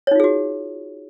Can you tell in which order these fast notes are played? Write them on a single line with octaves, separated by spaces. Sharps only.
C#5 D#4 F4 G#4 F#4